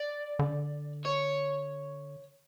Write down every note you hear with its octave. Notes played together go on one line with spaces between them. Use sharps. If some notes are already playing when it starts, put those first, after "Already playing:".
Already playing: D5
D3
C#5